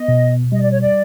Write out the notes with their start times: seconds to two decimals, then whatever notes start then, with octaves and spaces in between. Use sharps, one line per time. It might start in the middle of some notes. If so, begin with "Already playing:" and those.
Already playing: B3 D#5
0.08 B2
0.52 G3 D#5
0.62 D5
0.71 C#5
0.81 D5